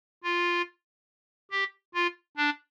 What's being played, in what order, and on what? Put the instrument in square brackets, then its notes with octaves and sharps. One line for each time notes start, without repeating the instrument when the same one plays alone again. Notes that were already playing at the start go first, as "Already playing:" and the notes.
[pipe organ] F4
G4
F4
D4